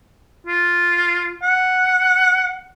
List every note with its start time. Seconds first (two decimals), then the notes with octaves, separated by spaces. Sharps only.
0.47 F4
1.43 F#5